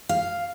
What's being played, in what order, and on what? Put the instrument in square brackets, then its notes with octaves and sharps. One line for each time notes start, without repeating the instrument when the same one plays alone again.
[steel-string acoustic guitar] F5